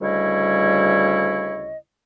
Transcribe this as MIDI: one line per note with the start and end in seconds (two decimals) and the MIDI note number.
0.02 1.77 38
0.02 1.77 49
0.02 1.77 55
0.02 1.77 64
0.02 1.77 73
0.02 1.77 75